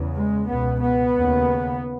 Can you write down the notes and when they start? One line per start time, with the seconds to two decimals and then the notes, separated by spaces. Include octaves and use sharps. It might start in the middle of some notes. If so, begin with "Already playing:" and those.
Already playing: E2 C#3
0.15 G#3
0.48 C#2 B2 B3
0.81 B3
1.15 D#2 C#3